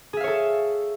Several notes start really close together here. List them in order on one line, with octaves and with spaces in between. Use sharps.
G#4 E5 F5 C#5 A4